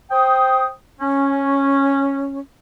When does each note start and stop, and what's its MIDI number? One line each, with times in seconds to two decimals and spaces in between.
0.11 0.67 72
0.11 0.67 79
0.11 0.67 87
0.99 2.40 61